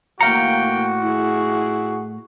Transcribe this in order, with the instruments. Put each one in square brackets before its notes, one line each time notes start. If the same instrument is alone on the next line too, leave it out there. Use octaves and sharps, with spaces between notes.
[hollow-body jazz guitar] A2 F5 A#5 [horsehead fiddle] A#3 G5 [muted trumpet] F#4 [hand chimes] C#7
[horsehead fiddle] E4 G#4